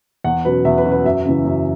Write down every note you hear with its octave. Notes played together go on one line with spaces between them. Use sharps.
E2 F#5
B2 F#3 C#4 B4
E2 E5
B4
B2 F#3 C#4
B4
F#2 E5
C#3 E3
F#2